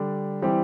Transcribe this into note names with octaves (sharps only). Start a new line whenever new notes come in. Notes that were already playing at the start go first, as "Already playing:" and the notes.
Already playing: D3 G3 D4
E3 G3 C4 G4